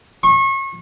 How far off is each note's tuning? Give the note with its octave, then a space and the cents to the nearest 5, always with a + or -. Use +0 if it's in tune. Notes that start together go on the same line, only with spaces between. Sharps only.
C#6 -35